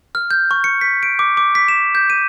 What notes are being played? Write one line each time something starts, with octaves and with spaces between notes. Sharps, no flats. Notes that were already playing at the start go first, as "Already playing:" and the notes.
F6
G6
C#6
C#7
B6
D7
D6
D6
B6
E7
G6
D#7